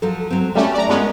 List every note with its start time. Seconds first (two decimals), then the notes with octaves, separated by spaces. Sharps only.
0.02 F3 F#3 A4
0.30 F#3 C4
0.55 G3 A3 C#4 F#4
0.74 D5 A#5
0.89 G#3 B3 C#4 F4 A#4